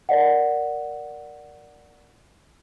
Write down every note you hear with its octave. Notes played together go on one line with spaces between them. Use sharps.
A#4 D5 D#5 F#5